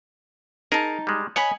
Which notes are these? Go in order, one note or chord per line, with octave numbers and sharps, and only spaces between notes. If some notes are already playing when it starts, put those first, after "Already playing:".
D#4 G#4 A#4 A5
G3 G#3
C#5 D#5 F#5 G#5 B5